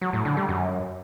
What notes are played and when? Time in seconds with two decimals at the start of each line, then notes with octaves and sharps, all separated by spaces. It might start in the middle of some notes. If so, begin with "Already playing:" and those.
0.01 F#3
0.13 A2
0.25 D3
0.37 G3
0.49 F#2